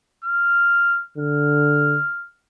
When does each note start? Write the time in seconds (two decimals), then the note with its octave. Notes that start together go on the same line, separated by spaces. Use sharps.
0.24 F6
1.17 D3 F6